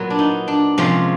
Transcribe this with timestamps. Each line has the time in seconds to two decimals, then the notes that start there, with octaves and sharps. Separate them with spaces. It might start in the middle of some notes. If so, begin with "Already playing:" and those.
Already playing: A#2 F#3 B3
0.10 D4
0.19 D#4
0.48 D4
0.78 C3 F3 G#3 C4 C#4